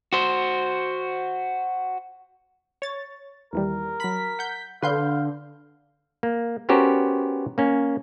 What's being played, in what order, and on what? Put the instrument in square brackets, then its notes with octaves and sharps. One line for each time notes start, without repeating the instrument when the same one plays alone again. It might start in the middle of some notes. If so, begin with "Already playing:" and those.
[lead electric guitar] F#4 C5
[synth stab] C#5 A6
[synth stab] D#2 E3 G3 [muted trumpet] A#4
[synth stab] F#3 B5 [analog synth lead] B6
[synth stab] F#5 G6
[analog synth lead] D3 [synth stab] B4 C6 G6 [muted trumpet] F5
[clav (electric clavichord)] A#3
B3 C#4 F#4 G4 A#4 C5
A#3 C#4